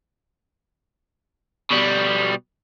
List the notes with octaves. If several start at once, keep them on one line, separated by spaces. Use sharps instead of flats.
B2 G3